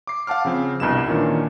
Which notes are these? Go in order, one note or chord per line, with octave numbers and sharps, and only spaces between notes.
D6 C7
F5 F#5 A5 D6 F6
C#3 F3 C4
C2 G2 B2 E7
A#2 D#3 E3 C#4 D4